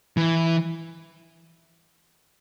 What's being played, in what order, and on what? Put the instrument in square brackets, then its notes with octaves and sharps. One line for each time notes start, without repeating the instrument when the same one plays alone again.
[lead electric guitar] E3